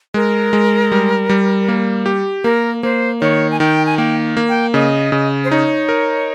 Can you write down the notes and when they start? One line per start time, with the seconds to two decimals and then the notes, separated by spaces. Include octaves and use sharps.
0.14 G#3 A#4
0.53 G#3
0.92 G3
1.29 G3
1.68 A#3
2.06 G4
2.44 A#3 A#4
2.83 A#3 C5
3.21 D#3 C#5
3.51 G#5
3.60 D#3 G5
3.86 G#5
3.98 A#3 G5
4.37 A#3
4.49 G5
4.74 C#3 D#5
5.12 C#3
5.44 C5
5.51 D#4 C#5
5.89 A#4